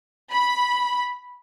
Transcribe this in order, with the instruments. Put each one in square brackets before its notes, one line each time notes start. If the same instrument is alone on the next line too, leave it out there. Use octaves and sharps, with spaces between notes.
[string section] B5